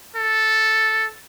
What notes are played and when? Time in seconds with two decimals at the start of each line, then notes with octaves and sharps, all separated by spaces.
0.16 A4